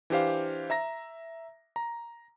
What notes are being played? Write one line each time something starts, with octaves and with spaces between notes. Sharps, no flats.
E3 D4 G4 C5 F5
E5 A#5 A#6
A#5